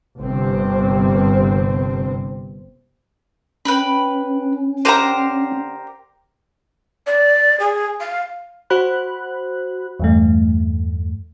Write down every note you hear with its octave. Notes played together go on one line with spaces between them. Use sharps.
G1 G2 C3 C4
C#4 B4 G5 B5
D3 G4 A#4 C5 A#5
D5
G#4
F5
F#4 C5 B5 F#6
E2 G2 A3